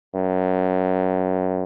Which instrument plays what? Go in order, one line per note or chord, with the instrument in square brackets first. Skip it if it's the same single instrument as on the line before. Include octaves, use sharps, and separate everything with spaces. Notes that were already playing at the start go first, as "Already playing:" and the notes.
[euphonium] F#2